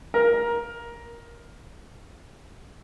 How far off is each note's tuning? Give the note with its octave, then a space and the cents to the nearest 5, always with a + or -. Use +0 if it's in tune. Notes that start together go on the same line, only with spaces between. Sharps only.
A#4 +15